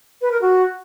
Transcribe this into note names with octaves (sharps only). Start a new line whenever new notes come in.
B4
A#4
F#4